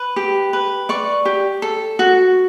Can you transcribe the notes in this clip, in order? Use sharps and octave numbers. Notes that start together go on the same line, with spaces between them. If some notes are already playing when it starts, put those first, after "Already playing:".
Already playing: B4
G4
B4
D5 C#6
G4
A4
F#4